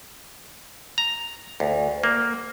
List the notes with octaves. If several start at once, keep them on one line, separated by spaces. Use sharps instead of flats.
A#5
D2
A#3